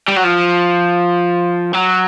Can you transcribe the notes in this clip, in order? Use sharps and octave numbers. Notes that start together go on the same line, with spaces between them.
G3
F#3
F3
F#3